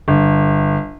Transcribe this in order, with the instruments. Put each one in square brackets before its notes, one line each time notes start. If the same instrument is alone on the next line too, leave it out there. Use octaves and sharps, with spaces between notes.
[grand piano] G1